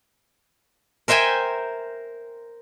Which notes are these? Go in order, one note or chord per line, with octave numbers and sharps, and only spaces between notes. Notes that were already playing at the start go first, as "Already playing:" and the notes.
A#4 C5 E5 G5 G#5